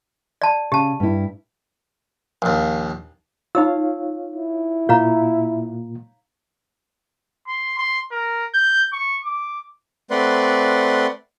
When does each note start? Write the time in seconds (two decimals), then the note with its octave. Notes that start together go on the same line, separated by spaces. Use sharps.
0.42 D5 A5
0.72 C#3 G4 A5
1.00 G2 E4
2.42 A#1 D#2
3.55 D#4 F4 C#5 F5 E6
4.36 E4
4.89 A#2 A#3 F4 C#5 F5 A#5
7.48 C6
7.78 C6
8.12 A#4
8.54 G6
8.93 C#6
9.24 D6
10.11 A3 C4 B4 D5 F#5 C6